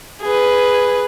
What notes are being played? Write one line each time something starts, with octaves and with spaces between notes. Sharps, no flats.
G#4 B4